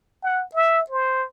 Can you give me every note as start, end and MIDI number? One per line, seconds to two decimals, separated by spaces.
0.23 0.44 78
0.55 0.82 76
0.90 1.25 72